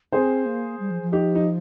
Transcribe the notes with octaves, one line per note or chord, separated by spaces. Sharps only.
C4 G#4 C5
A#3
G3
F3
F3
D#4 G4
D#4